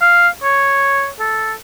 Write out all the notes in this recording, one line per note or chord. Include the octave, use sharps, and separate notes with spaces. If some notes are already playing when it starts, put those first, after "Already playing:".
F5
C#5
A4